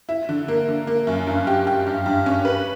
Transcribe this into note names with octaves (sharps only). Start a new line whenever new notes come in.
E4
D3
A#3
D3
A#3
F#2
G2
G4
G4
G2
G2
C#4
B4